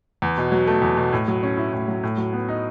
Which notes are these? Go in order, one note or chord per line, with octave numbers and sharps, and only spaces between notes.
E2
B2
F#3
A3
E2
B2
A2
F#3
C#4
E4
A2
F#3
A2
F#3
B3
D#4